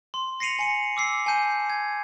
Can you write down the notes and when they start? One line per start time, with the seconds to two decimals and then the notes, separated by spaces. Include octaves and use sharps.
0.14 C6
0.40 A#6 C7 C#7 D#7 F7 F#7
0.59 G#5 C#7 D#7
0.97 D6 E6 C7
1.26 G#5 A5 G6 D#7
1.70 G#6